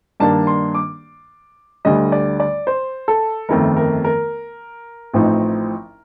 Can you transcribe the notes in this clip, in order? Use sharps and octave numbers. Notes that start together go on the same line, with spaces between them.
G2 D#3 A#3 D4 A5
C6
D6
D2 D3 G3 D#5
D5
D5
C5
A4
G1 F2 D#3 A3 A#4
A#4
A#4
A1 A2 F3 C4 D#4